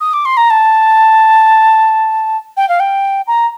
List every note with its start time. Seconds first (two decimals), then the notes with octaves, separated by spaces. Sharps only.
0.00 D#6
0.13 D6
0.25 C6
0.37 A#5
0.50 A5
2.57 G5
2.69 F5
2.80 G5
3.27 A#5